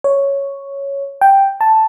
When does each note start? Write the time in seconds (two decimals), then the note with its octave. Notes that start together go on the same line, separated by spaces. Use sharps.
0.04 C#5
1.21 G5
1.61 A5